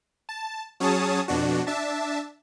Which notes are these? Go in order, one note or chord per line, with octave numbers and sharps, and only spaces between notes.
A5
F#3 C#4 G#4 C#5 A5 D#6
F2 B2 D4 F#4
D4 E5 A5